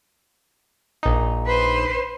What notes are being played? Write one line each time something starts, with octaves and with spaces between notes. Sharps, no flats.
A#1 D#4
B4 C5